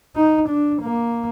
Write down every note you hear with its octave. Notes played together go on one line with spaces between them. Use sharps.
D#4
D4
A#3